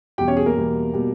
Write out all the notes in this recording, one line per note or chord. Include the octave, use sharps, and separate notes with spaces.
E2 B2 G3 G4 G5
C#4 C#5
G#4
A#3 A#4
E2 B2 G3
B2 G3